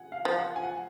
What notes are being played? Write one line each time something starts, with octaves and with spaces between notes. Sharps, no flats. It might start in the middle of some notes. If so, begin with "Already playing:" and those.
Already playing: F#5 G#5
F5
F3
F#5
G#5
F#5